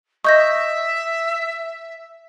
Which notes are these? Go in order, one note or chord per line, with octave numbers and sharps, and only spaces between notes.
D#5 E5 C#6 G6 A#6